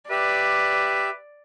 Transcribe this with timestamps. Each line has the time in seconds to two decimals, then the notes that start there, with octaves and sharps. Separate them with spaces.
0.10 G4 B4 D5 E5